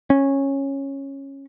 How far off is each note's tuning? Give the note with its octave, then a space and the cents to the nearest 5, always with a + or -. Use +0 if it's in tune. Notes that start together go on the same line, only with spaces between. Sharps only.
C#4 -15